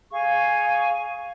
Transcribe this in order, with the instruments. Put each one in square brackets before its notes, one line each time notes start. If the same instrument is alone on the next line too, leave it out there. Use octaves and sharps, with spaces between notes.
[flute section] G#4 F5 C#6